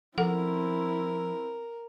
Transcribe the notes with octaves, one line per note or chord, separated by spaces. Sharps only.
F3 C4 E4 A4 A#4 F#5